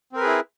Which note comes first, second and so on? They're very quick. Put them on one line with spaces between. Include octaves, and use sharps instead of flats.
C4 A#4 B4 G#4 E4